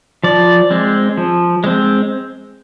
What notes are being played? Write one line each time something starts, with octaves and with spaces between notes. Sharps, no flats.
F3 D5
G#3 C4
F3
G#3 C4